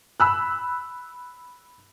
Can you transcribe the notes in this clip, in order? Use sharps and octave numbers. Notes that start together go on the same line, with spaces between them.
B5 E6 F#6